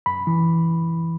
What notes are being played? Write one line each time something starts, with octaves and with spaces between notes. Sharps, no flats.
F#2 B5
E3